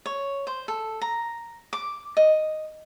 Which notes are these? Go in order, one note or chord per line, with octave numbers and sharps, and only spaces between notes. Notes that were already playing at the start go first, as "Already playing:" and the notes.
C#5
C5
A4
A#5
D6
D#5